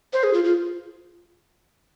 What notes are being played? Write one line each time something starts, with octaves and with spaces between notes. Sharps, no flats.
C5
G#4
F4
F4